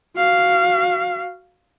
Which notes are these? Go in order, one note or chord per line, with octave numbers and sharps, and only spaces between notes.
F#4 F5